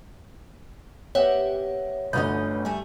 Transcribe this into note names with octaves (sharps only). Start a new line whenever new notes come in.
B3 G4 C#5 D#5 E5 F#5
G1 D2 D3 B3 C#4 D#5 G6
G3 A3 G#5